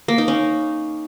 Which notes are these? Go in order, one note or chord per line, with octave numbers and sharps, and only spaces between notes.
A#3
D#4
C#4